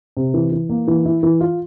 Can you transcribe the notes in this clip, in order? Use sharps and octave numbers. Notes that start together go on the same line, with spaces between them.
C3
E3
E3
A#3
E3
E4
E3
F4